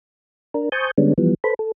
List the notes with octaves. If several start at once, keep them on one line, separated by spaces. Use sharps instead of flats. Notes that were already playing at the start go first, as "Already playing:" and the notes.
D4 A#4
C5 G#5 A5 C#6 D#6 G6
D3 G3 G#3 B3 C#4 D4
E3 F3 G3 B3
A4 B4 C5 B5
A4